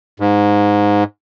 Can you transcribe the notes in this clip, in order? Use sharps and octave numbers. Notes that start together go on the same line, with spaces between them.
G#2